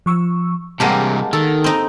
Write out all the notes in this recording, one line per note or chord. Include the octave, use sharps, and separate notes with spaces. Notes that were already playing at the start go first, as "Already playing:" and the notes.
F3 C#6 E6
G2 C3 G#3 A#3 G4 F#5 A5
D#3 A4
C4 D#4